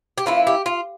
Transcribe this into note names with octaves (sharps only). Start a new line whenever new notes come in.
G4
E3 A#3 C#4 E4 F4
G4
F4